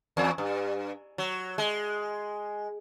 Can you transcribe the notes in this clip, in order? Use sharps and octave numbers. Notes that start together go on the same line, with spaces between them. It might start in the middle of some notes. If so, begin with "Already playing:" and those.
E2
G2
F#3
G#3